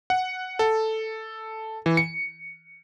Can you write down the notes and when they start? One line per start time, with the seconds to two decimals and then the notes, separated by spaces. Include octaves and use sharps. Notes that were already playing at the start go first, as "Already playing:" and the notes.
0.10 F#5
0.59 A4
1.86 E3
1.97 C#7